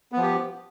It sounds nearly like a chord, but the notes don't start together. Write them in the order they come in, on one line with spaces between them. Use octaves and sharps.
B3 F3 G4